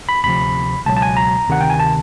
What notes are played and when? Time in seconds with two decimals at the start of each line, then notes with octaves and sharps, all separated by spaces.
0.09 B5
0.24 D2 C3 F3 B5
0.86 C#2 B2 F#3 A5
0.97 A5
1.02 G#5
1.17 A#5
1.48 D2 C3 D#3 F#5
1.61 G5
1.70 G#5
1.80 A5